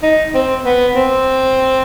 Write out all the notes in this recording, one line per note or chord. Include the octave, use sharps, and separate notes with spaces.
D#4
C4
B3
C4